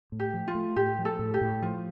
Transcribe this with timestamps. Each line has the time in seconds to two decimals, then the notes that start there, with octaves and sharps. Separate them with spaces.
0.12 A2
0.20 G4
0.34 F3
0.48 F4
0.55 A3
0.76 A2 G4
0.99 F3
1.05 A4
1.19 A2
1.34 G4
1.41 A2
1.62 F3 F4